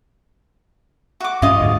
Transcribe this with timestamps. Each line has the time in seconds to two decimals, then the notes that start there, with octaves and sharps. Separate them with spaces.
1.20 F#4 D6
1.42 G2 C#4 F4 D#5
1.61 D2 G#2